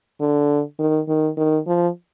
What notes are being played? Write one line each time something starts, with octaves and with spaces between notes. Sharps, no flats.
D3
D#3
D#3
D#3
F3